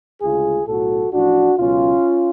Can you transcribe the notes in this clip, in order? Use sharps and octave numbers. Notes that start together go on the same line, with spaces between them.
D2 C#3 G#3 F4 G#4
B1 A2 F#3 F#4 A4
A1 A2 F3 D4 F#4
C#2 B2 F#3 C#4 F4